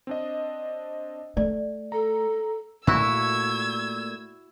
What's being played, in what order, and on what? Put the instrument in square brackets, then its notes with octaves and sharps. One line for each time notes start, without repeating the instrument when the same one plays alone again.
[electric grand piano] C4 D4 D#5
[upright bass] A3 [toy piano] D5
[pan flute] A4 [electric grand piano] A#5
[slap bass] A#2 A3 [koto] E4 F#4 [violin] E6 G#6